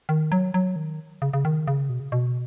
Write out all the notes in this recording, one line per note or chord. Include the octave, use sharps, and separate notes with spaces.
D#3
F#3
F#3
D#3
C#3
C#3
D#3
C#3
B2
C#3
B2